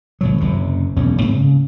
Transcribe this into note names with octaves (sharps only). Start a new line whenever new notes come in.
G#1 B2 F#3
F#1 F#2 C3
E1 B1 E2 C#4
G#2 A#3 C4
C#3